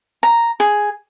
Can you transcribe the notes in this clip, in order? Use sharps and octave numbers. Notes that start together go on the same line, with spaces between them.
A#5
G#4